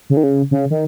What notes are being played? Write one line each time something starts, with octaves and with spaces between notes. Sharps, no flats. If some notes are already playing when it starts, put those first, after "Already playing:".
C#3
D#3
C#3
C#3
D#3